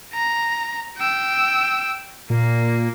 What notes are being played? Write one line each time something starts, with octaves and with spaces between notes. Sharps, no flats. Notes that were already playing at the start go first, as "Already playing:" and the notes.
A#5
G5 E6
A#2 A#3